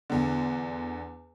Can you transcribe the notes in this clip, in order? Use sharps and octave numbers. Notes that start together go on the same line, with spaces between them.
E2 D3